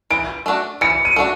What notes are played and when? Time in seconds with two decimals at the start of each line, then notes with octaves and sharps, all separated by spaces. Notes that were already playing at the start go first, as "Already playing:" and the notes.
0.11 E3 D7
0.46 A3 D4 F#4
0.81 E3 C#7
1.05 D#7
1.16 A3 D4 F#4